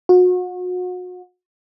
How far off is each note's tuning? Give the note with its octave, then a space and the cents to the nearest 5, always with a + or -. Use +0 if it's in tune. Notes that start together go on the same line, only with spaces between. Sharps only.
F#4 -35